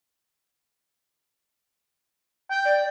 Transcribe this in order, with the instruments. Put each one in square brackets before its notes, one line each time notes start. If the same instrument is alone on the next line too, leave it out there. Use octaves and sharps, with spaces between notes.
[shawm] G5
[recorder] D5